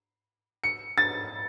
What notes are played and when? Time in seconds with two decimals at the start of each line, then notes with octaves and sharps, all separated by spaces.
0.64 C#7
0.98 A6